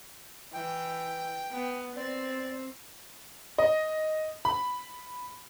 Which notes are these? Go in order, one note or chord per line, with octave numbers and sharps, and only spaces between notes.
E3 G5
B3
C4 D5
D#5
B5